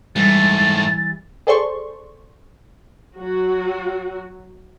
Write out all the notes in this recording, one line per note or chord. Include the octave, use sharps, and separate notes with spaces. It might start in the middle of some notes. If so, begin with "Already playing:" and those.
G#2 E3 G3 A3 A6
G#4 A4 C5 D5 C6 C#6
F#3 F#4